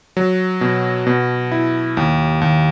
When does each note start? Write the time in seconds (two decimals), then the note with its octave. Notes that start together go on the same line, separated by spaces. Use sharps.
0.17 F#3
0.61 B2
1.07 B2
1.52 E4
1.97 D#2
2.41 D#2